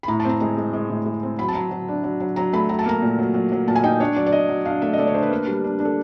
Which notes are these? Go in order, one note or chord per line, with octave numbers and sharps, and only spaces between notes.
B5
A2 A#5
A5
C4 A#5
G#3 A#5
G#3
G#3
A2
G#3
C4
F#3 B5
A5
F#3 A#5
F#3
D4
F#3
F#3
F#3 A#5
A3 B5
F#3 A#5
A5
A#3 A#5
A#2
F#3
F#3
F#3
A#2 A5
G#5
D#4 G5
D4 C#5
F#3 D5
D5
D4 D#5
F#3
D4 F5
A3 E5
D#5
A3 D5
C#5
D4 C5
B4
A#3
G3
D4
D4
A4